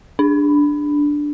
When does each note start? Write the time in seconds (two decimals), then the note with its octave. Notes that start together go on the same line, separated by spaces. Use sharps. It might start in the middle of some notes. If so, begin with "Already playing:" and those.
0.19 D4